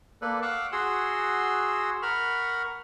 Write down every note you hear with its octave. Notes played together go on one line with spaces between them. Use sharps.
A#3 A4 B4 D5
F5 F#5 C#6 D6 E6 F#6
F#4 G#4 F#5 C6 E6
A#4 F#5 B5 C#6 F6